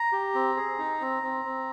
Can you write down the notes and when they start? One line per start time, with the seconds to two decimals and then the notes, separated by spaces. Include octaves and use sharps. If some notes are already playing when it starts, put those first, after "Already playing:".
Already playing: A#5
0.12 G4
0.35 C4
0.57 G#4
0.79 D#4
1.01 C4
1.23 C4
1.45 C4